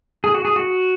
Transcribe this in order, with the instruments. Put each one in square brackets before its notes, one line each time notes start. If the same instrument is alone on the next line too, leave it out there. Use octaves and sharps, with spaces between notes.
[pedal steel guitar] G#4
F#4
G#4
F#4